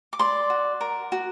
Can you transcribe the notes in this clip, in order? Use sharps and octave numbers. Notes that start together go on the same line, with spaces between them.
D6
D5 C6
F#4
A#4
F#4